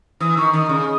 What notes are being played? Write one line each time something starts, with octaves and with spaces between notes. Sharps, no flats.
E3 D#6
D#3 C#6
D#3 D#6
C#3